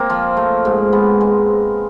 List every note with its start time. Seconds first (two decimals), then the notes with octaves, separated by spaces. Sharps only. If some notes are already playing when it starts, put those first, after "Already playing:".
Already playing: A#3 C4
0.10 F3
0.37 A3
0.65 G#2
0.93 G#3 B3
1.21 G#3